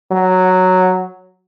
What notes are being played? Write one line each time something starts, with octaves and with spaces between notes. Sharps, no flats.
F#3